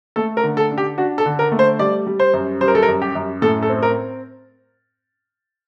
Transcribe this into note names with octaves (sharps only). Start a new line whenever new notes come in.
A3 A4
A#4
D3
A4
D4
G4
D4 F#4
A4
D3
A#4
A3
C5
G3 D5
G3
C5
F#2
G3 C5
A#4
A4
A#4
F#2
G4
F#2
A2 A4
A4
C4
A#4